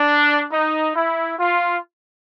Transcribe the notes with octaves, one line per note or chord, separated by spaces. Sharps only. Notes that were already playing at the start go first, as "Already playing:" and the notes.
Already playing: D4
D#4
E4
F4